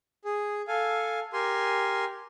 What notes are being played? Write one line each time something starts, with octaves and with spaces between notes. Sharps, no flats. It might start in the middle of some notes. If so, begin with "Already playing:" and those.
G#4
A4 F5 G#5
G4 A#4 G#5 C6